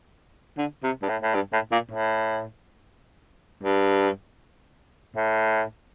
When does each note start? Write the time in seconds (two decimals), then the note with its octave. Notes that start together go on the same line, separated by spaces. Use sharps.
0.58 D3
0.83 C3
1.02 G2
1.09 A2
1.22 A2
1.34 G2
1.53 A2
1.72 A#2
1.92 A2
3.63 G2
5.16 A2